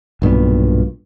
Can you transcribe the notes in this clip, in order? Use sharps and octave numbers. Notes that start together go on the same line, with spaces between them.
B1 G2 A#2 B3